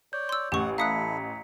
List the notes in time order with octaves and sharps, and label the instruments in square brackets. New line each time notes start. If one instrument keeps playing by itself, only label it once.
[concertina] C#5 D5 [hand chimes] G6
[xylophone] C6 E6
[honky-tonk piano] A1 [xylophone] G4 C#6 [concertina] F#5
[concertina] E4 A4 [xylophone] F5 D#6 F#6 [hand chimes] A#5 B6 C#7